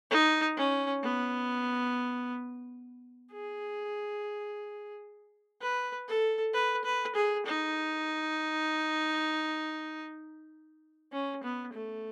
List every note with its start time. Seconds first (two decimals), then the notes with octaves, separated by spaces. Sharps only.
0.10 D#4
0.57 C#4
1.03 B3
3.32 G#4
5.61 B4
6.08 A4
6.54 B4
6.84 B4
7.15 G#4
7.45 D#4
11.12 C#4
11.43 B3
11.73 A3